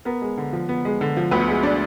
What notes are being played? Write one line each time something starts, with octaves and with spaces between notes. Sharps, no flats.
B3 A#4
G#3
D3
F3
B3
G#3
D3
F3
D2 B3 B4
G#3
D4 D5